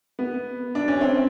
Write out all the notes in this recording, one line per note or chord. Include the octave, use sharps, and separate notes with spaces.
B3
D4
C#4
C4